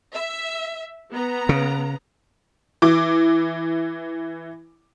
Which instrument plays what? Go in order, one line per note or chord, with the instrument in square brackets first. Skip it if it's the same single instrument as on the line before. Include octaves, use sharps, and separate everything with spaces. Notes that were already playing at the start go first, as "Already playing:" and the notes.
[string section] E5
B3 A#5
[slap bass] C#3
[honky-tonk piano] E3 D6